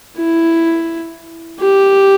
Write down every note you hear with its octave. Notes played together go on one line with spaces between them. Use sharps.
E4
G4